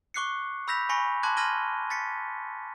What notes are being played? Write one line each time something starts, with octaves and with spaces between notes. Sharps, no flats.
C#6 D6 F#6 C7 C#7
B5 E6 G6 A#6 B6 F7
G#5 B5 C#6 A#6 C#7
A5 C6 D6 F#6 G#6
C6 F6 G#6 A#6 D#7 G7
A6 B6 C#7